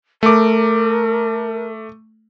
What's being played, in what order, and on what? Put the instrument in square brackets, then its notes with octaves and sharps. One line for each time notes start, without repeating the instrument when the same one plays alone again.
[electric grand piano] A3 D6 [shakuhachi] A#4